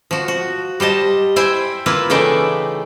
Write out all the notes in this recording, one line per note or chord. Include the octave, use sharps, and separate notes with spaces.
F3 F#4
F#4
G3 C5 D#5 A5
E4 C5 G5 G#5
A#3 E4 F4 B4
C#3 E3 A3 D#4 D5 G5